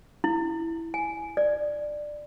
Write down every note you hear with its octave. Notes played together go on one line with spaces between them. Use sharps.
E4
G#5
D5